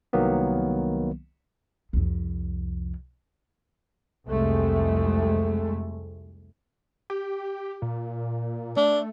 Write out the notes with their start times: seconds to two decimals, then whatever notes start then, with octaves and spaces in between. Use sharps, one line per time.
0.13 C2 D#3 F#3 A#3 B3
1.93 C2 F2
4.28 C2 F2 C3 G#3 A3
7.10 G4
7.82 A#2
8.77 A3 D4